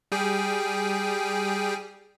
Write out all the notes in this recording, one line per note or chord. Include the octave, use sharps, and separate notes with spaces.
G3 G#4 G5